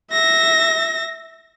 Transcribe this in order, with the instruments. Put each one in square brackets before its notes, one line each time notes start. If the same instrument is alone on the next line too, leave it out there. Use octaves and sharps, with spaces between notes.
[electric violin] E5 A#6